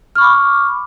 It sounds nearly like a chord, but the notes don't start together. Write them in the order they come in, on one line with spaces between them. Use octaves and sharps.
F6 C#6 B5 D6